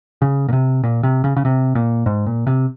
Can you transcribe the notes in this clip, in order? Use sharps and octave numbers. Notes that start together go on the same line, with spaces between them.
C#3
A#2
C3
A#2
C3
C#3
C#3
C3
A#2
G#2
A#2
C3